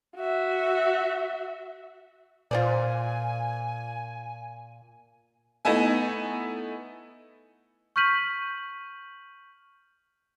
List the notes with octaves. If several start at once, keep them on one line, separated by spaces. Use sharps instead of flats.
F#4 E5
A#2 F4 C5 D5 G#5
A3 B3 D#4 E4 G#5
C#6 F6 G6 B6 D#7 F#7